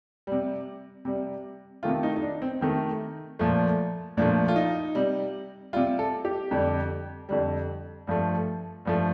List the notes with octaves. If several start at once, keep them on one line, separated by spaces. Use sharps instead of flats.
C3 G3
C3 G3
C3 D#3 A3 F4
D#4
D#4
D4
C4
C3 D#3 A3
A#2 F3 A3
A#2 F3 A3 D4
F4
D#4
C3 G3
C3 G3 F4
A4
G4
F2 D3 G3
F2 D3 G3
G2 F3 A3
G2 F3 A3